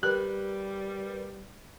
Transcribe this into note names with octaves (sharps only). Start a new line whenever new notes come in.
G3 G4 A#4 B4 F#6